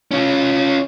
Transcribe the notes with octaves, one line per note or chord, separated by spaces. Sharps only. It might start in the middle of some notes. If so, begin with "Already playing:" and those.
C#4 F4